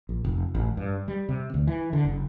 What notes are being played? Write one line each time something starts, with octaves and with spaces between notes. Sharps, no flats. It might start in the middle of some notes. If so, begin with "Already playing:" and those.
A#1
F1
A1
G2
G3
C3
D2
E3
D3
F#1